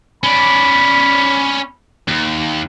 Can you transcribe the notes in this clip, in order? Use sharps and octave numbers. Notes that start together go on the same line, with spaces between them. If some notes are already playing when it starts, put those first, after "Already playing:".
C#4 D5 B5
D#2